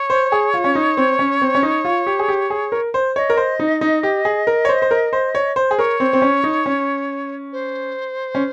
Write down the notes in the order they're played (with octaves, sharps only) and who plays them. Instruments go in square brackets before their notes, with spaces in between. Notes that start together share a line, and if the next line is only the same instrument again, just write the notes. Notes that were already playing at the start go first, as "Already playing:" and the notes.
Already playing: [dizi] C#5
[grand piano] C5
G#4
F4
C#4
D#4
C4
C#4
C4
C#4
D#4
F4
G4
G#4
G4
G#4
A#4
C5
[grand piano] C#5 [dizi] D#5
[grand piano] A#4
C5
D#4
D#4
G4
G#4
A#4
C#5
C5
C5
A#4
C5
C#5
C5
G#4
[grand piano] A#4 [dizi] C#5
[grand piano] C4
C4
C#4
D#4
C#4
[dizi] C5
[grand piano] C#4